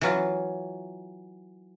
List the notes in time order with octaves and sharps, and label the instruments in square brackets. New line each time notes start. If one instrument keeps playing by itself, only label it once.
[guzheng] E3 F#3 F4